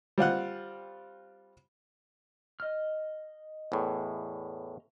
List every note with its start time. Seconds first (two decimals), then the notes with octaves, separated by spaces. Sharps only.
0.18 G3 C4 F4 F#5
2.60 D#5 F6
3.72 E2 A2